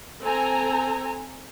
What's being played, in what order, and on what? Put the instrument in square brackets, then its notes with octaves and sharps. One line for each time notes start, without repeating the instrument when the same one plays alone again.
[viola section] C4 A4 G#5 A#5